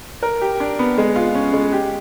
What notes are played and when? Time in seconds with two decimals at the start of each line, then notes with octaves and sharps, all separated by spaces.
0.23 A#4
0.42 G4
0.60 D4
0.79 B3
0.98 G#3
1.16 F4
1.35 C#4
1.53 G#3
1.73 G4